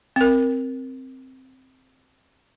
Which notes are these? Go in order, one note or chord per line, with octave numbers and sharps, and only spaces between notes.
C4 A#4